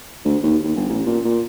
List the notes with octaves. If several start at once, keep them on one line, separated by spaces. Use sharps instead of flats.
D2
D#2
D#2
G1
A1
A#2
A#2